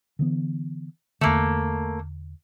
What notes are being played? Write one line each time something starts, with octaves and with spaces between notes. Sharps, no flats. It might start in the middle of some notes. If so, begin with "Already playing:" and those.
D3 E3 B3
E2 D3 A3 A#3